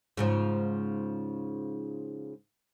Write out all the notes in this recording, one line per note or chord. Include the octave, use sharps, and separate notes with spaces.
G#2 C#3 F3